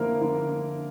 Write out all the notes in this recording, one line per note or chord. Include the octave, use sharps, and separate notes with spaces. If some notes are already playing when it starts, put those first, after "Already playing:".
Already playing: D3 F3 A#3 E4 A#4
D3